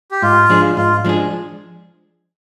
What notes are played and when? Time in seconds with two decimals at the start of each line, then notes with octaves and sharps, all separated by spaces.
0.11 G4
0.22 G#2 F4
0.50 F3 G#3 D4 G#4
0.77 G#2 F4
1.05 F3 G#3 D4 G#4